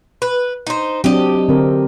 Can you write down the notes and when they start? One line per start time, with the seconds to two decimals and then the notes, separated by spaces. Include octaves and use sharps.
0.22 B4
0.67 D#4 C5
1.04 F#3 C4 D4 G4 D#5
1.48 D3 C4 A#4